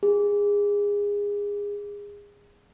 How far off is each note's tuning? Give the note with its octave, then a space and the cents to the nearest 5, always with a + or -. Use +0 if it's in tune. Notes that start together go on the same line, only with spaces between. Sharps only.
G#4 -25